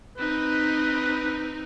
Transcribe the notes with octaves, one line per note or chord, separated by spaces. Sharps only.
C4 D#4 B4